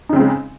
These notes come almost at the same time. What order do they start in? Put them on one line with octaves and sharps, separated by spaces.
D#4 C#3 C4 G#3